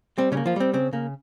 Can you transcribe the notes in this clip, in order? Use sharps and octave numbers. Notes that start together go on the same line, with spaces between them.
G3 C4
C#3 C#4
A#3
F3 F4
G3 C4
C#3 C4
C#3 A#3